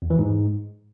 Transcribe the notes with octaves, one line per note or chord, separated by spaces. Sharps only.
E2
E3
G#2